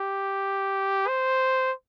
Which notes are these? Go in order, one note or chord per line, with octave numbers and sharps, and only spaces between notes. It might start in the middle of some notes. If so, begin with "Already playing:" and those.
Already playing: G4
C5